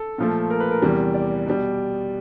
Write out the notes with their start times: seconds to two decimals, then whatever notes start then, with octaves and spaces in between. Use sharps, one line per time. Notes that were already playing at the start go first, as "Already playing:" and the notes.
Already playing: A4
0.18 A#2 F3 A3
0.50 A#4
0.60 B4
0.71 A#4
0.82 E2 C3 E3 G3
1.14 D5
1.46 B2 G3